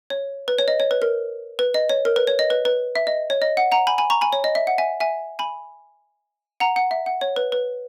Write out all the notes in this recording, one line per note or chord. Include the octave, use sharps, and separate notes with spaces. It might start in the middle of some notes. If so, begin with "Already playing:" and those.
C#5
B4
C#5
D#5
C#5
B4
A#4
B4
D#5
C#5
A#4
B4
C#5
D#5
B4
B4
E5
D#5
C#5
D#5
F#5
F#5 A#5
G#5 B5
G#5 B5
A#5 C#6
G#5 B5
C#5
D#5
E5
F#5
E5 G#5
E5 G#5
G#5 B5
F#5 A#5
F#5
E5
F#5
C#5
B4
B4